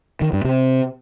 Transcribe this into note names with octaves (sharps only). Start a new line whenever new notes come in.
D#3
G2
C3